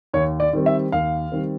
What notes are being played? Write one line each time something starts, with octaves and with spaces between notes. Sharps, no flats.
D#2 C#5
D5
D#3 G3 C4
E5
D#2 F5
D#3 G3 C4